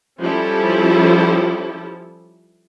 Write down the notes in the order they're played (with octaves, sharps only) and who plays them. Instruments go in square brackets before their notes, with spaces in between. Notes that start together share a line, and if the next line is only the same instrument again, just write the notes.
[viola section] F3 G3 C#4 E4 G4 A4